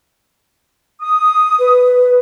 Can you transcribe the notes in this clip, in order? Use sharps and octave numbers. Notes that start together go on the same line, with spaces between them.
D#6
B4